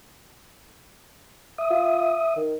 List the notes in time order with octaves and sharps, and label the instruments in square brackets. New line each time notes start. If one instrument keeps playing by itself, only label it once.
[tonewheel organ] E5 D#6
[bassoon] F4
D#3